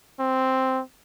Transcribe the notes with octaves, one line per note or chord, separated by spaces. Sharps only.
C4